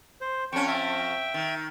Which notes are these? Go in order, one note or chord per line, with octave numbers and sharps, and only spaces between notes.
C5
F2 C#4 G5 C#6
E5 G5
D#3